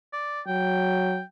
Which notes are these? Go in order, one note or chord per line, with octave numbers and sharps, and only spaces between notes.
D5
F#3 G5